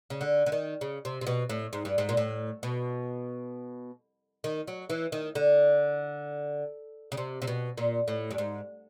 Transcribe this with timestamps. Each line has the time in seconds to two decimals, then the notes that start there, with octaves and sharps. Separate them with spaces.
0.10 C#3
0.21 D3
0.46 D3
0.52 D#3
0.81 C#3
1.05 C3
1.21 C3
1.27 B2
1.49 A2
1.73 G#2
1.85 G2
1.98 G#2
2.09 A#2
2.17 A2
2.63 B2
4.44 D#3
4.68 F#3
4.90 E3
5.12 D#3
5.35 D3
7.12 C#3
7.17 C3
7.42 C3
7.47 B2
7.78 A#2
8.08 A2
8.31 G2
8.38 G#2